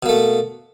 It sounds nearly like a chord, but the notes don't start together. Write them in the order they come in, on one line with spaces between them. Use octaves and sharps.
B2 A#3 A3